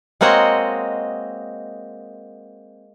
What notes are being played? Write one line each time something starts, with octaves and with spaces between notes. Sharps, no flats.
G#3 A#3 C4 F#4 C#5 D#5